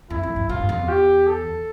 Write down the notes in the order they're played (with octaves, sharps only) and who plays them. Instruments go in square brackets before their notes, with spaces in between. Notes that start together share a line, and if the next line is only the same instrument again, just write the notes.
[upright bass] F2 [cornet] E4
[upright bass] F2
G2
[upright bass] A2 [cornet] F4
[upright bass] G2
F2
E2
[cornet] G4
A4